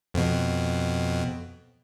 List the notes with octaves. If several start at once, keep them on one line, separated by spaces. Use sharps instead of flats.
F2 B2